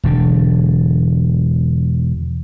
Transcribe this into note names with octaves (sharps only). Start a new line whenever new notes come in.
E1 D3